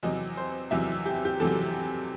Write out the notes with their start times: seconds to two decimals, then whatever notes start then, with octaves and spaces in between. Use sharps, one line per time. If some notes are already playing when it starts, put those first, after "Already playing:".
0.03 E2 C3 F#3 D#5
0.37 C5
0.71 E2 C3 F#3 E5
1.06 G4
1.25 G4
1.40 E2 C3 F#3 A4